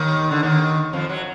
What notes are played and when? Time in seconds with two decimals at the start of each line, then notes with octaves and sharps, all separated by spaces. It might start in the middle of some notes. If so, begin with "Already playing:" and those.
Already playing: D#2 D#3
0.31 D3
0.43 D#2 D#3
0.93 F2 F3
1.09 F#3